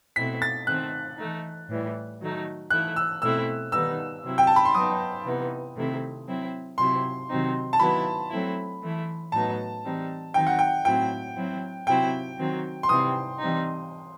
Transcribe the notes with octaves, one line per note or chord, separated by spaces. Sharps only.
B2 A3 C4 E4 B6
A6
D#3 A3 C4 F#6
E3 A3 D#4
A2 E3 G3
D#3 F#3 A3 D#4
E3 A3 E4 F#6
E6
B2 A3 C4 E4 E6
D#3 G3 B3 D#4 E6
C3 F#3 C4 E4
G5
A5
B5
C6
F#3 B3 D#4 D#6
C3 E3 B3 D#4
C3 D#3 A3 C4 E4
F#3 C4 E4
C3 F#3 C4 E4 C6
C3 D#3 F#3 C4 D#4
A5
D#3 F#3 B3 E4 B5
F#3 A3 C4 E4
E3 A3 E4
A2 F#3 B3 D#4 A5
E3 G3 C4 D#4
D#3 F#3 C4 D#4 G5
F#5
G5
A2 F#3 C4 E4 G5
F#3 C4 E4
C3 F#3 C4 E4 G5
D#3 F#3 C4
C6
C3 E3 G3 C4 D#6
E3 G3 C4 D#4